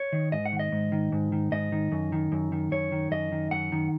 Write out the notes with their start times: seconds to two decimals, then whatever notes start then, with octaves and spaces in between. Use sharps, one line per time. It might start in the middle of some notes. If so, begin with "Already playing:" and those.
Already playing: C#5
0.13 D#3
0.32 G#2 D#5
0.45 F#5
0.52 D#3
0.59 D#5
0.72 G#2
0.92 D#3
1.12 G#2
1.32 D#3
1.52 G#2 D#5
1.72 D#3
1.92 F#2
2.12 D#3
2.32 F#2
2.52 D#3
2.72 F#2 C#5
2.92 D#3
3.11 F#2 D#5
3.32 D#3
3.51 F#2 F#5
3.72 D#3